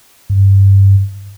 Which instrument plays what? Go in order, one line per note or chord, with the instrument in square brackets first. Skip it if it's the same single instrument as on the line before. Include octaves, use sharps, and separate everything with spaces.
[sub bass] G2